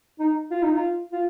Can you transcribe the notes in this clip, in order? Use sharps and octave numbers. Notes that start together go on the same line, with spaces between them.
D#4
F4
D#4
F4
F4